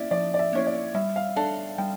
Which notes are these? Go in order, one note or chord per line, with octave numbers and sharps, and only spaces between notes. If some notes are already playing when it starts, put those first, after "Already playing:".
Already playing: A#3 C#4 E4 D5 E5
F3 D5
D5
E5
A#3 C#4 E4 C#5
D5
G3 E5
F5
D4 A4 D5 A5
G3 G5